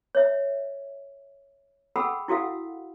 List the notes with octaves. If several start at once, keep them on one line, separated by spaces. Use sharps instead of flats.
C#5 E5
G#4 A4 F#5 G5 B5 E6
E4 F#4 A4 F5 F#5